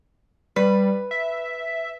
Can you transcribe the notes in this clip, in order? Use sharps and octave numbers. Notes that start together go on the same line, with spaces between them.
G3 B4
E5